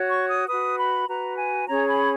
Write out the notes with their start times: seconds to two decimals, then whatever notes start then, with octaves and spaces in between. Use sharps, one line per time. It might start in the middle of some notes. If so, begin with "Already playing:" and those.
Already playing: F#4 C#5
0.09 C#6
0.29 D#6
0.48 F#4 B4 D#6
0.78 B5
1.08 F#4 B4 A#5
1.38 G#5
1.68 C#4 G#4 C#5 A#5
1.89 B5